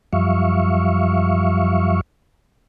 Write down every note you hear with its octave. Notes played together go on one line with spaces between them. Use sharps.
F#2 F3 G3 E5 F5 C#6